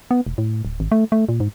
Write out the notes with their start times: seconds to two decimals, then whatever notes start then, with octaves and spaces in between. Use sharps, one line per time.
0.11 B3
0.27 E1
0.38 A2
0.65 D1
0.80 G#1
0.92 A3
1.12 A3
1.29 A#2
1.40 G#2